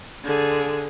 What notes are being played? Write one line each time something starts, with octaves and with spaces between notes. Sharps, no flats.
D3 G#4